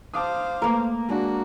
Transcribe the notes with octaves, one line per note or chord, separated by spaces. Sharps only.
C5 F5 A5 D6 D#6
A3 A#3 A#4 B4
G#3 D4 F#4